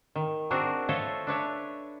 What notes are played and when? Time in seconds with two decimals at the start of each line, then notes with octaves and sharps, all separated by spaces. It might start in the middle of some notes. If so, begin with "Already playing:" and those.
0.15 D#3
0.51 C4 D4 F#4 G#4 A#4
0.89 F4 A4 C5 C#5 D#5 E5
1.27 D4 B4 C#5 E5